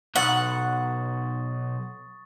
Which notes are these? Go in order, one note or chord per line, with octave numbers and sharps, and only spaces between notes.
B1 F#5 C#6 D#6 A6